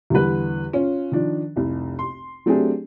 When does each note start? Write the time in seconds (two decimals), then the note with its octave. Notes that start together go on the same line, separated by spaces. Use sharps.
0.10 E2 D3 G3 B4
0.73 C#4 F4
1.12 D#3 F3 D4
1.56 F1 C2
1.99 C6
2.46 F#3 A3 C4 D4 G4 G#4